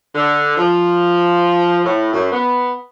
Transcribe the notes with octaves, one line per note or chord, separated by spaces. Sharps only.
D3
F3
A2
F#2
B3